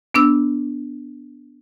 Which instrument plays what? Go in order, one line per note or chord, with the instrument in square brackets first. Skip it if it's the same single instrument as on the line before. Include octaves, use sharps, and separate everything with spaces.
[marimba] B3 D4 E6